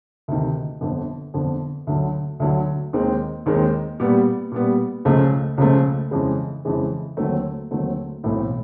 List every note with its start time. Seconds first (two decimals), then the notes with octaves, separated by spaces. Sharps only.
0.28 D2 C3 D#3
0.81 G1 F2 D3
1.34 G1 F2 D3
1.87 D2 D3 F#3
2.40 D2 D3 F#3
2.93 D#2 D#3 G#3 C4
3.46 D#2 D#3 G#3 C4
4.00 A#2 G3 B3
4.52 A#2 G3 B3
5.05 C#2 C#3 F3 A3
5.58 C#2 C#3 F3 A3
6.11 F2 C#3 E3 G#3
6.65 F2 C#3 E3 G#3
7.17 D#2 D3 F#3 A3 C4
7.71 D#2 D3 F#3 A3 C4
8.24 B1 A2 E3 A3 C4